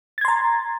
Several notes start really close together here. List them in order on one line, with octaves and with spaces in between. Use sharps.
A6 G#6 C6 A#5